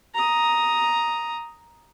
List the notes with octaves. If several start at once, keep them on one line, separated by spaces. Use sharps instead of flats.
A#5 D#6